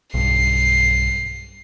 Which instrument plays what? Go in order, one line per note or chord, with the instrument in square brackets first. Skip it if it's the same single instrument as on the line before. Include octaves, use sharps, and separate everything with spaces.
[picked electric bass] B1 G2 [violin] C7